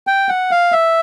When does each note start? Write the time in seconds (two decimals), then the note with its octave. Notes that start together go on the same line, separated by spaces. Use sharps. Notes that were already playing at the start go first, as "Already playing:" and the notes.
0.07 G5
0.29 F#5
0.51 F5
0.72 E5